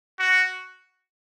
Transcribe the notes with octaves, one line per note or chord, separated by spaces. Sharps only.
F#4